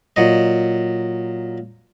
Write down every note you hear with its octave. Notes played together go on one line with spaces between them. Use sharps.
A#2 F#3 D#5